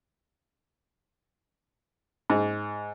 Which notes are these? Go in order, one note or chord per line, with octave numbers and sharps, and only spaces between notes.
G#2